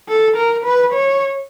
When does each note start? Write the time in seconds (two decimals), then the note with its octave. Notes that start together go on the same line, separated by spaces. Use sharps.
0.08 A4
0.36 A#4
0.64 B4
0.93 C#5